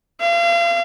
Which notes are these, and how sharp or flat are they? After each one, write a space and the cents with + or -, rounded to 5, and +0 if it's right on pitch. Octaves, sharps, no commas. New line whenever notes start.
F5 -35